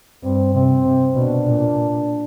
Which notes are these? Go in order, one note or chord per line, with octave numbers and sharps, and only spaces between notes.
G2 C4
C3 C4
C3
B2 D4
A#2